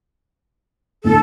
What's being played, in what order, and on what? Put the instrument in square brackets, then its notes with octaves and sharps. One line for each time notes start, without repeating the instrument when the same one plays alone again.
[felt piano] D2 A2 [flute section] A4